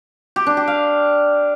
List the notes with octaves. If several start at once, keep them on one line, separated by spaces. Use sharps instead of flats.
G4
D4
G4
F5